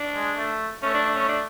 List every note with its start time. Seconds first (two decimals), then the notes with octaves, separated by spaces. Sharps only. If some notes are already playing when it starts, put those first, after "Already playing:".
Already playing: D4
0.15 G#3
0.37 A3
0.82 A3 C#4
0.94 D4
1.06 D4
1.16 C#4
1.28 D4